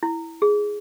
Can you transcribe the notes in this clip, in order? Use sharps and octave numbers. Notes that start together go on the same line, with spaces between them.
E4
G#4